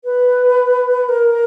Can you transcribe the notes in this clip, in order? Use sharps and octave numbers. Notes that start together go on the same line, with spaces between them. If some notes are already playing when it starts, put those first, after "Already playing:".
B4
A#4